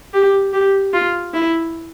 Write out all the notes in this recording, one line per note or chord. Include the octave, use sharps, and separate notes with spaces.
G4
G4
F4
E4